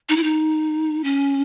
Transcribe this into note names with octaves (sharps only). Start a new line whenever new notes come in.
D#4
E4
D#4
C#4